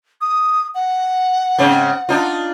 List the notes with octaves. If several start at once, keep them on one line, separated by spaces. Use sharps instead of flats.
D#6
F#5
G#2 C#3 C4
D4 D#4 F4